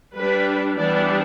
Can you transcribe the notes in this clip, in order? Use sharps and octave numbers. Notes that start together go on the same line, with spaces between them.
G3 D4 B4
E3 G3 B3 D4 D5